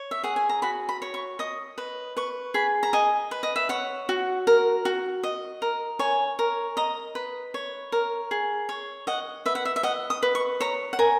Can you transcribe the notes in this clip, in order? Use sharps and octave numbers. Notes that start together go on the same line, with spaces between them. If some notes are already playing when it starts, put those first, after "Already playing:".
Already playing: C#5
E5
G#4 F#5
G#5
A#5
F#4 B5
B5
C#5
C#6
D#5 D#6
B4
B4 C#6
G#4 B5
A#5
D#5 G#5
B4
D#5
E5
C#5 F#5
F#4
A#4
F#4
D#5
A#4
C#5 G#5
A#4
D#5 A#5
B4
C#5
A#4
G#4
C#5
D#5 F#5
B4 E5
F#5
E5
E5
D#5 F#5
D#6
B4
C#6
C#5 A#5
F#5
A#4 G#5